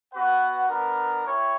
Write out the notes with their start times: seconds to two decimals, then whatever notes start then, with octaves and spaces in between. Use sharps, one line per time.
0.13 B3 F#4 B4 F#5
0.69 B3 D4 A#4
1.26 E4 G4 C#5